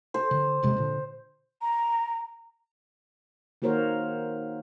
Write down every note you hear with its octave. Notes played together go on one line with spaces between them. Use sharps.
C5
D3
D#2 C3 G#3
A#2 D3
A#5
D#3 A#3 F#4 A#4 C5 C#5